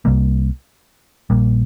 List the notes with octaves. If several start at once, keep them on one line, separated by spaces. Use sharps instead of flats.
C2 C3 G3 A#3
A#1 A#2 G3 A#3